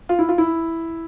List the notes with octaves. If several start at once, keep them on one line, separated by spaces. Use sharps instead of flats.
F4
E4
F4
E4